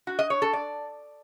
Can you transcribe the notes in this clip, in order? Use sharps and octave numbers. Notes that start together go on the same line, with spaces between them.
F#4
D#5
C#5
A4
D5